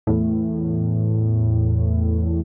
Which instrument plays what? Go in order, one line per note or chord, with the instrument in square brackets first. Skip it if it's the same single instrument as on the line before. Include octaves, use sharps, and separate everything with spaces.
[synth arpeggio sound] E2 A2